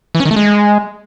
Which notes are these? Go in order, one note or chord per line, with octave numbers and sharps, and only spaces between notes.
E3
C#4
D#3
A3
G#3